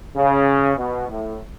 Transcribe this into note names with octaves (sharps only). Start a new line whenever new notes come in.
C#3
B2
A2